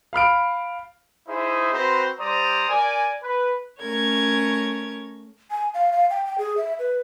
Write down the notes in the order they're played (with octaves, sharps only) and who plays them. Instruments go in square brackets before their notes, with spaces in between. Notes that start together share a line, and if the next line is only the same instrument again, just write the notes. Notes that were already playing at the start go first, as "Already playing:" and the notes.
[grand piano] F5 B5 F6 D7
[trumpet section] D#4 E4 G#4 C5 E5
C4 F#4 B4 C5 A#5
G3 C5 D5 A#5 D#6
A#4 D5 G#5
B4
[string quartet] A3 C#4 A#4 C#5 G#6
[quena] G#5
F5
F5
G5
G5
G#4
E5
B4